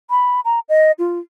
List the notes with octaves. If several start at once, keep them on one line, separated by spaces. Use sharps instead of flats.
B5
A#5
D#5
F4